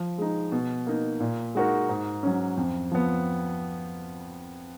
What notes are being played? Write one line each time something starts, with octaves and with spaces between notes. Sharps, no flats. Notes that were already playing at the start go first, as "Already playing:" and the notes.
Already playing: F3
G#3 D#4
B2
A#3 D#4
A#2
G#3 D#4 F#4 A#4
G#2
F#3 C#4
F2
F3 B3